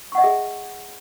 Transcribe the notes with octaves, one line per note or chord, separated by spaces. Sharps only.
G#4 D#5 E5 F#5 C#6